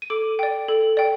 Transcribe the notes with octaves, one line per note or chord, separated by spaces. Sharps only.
D#7
A4 D6 D7
D5 G5
A4
D5 G5